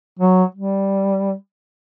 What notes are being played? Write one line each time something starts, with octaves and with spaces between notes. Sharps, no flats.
F#3
G3